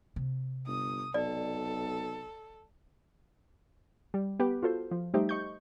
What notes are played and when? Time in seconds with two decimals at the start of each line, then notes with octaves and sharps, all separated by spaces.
0.16 C3
0.67 G1 D#6
1.14 B1 A4 D5
4.14 G3
4.40 B3 G4 B4
4.63 F4 F#4 A4 C5
4.91 F3
5.14 G3 A3 D#4 G4 C5 E5
5.29 D#5 C#6 G6